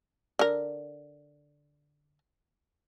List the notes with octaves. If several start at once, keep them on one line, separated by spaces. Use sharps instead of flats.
D3 A#4